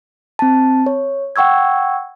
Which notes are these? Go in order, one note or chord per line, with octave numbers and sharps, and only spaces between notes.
C4 A5
C#5
F#5 G5 C#6 E6 G#6